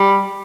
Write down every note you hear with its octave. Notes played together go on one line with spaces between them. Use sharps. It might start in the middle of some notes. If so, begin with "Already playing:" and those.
Already playing: G3